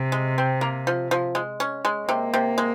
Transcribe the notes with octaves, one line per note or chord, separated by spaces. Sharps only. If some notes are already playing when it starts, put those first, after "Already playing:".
Already playing: C3
G#3
C4
A#3
F3
F3
G#3
C#4
G#3
C3 A#3
C3
G#3